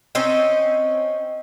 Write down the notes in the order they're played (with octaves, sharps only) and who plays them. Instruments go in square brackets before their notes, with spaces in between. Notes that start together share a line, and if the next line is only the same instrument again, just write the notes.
[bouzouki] C4 C#4 D#4 D#5